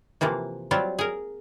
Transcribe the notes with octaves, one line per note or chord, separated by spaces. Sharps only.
C3 E3 F3 A#3
F#3 G3 C4 F4
G#4 A#4